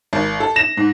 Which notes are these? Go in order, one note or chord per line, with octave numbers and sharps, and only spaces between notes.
G#1
A4
A#6 E7
G#2